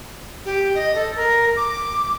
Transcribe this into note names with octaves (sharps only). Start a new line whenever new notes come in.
G4
D#5
A4
A#4
D6